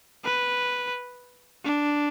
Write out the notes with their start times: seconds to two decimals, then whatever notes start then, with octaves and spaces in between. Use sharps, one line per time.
0.24 B4
1.65 D4